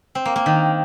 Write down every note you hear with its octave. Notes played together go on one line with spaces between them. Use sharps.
C4
A#3
A#3
D#3